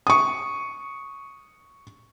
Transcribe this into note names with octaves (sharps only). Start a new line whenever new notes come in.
C#6 D#6